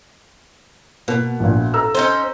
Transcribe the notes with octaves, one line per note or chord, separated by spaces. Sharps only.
B2 A#3
A#1 A#2
A4 A#5 E6
C#4 D#4 C5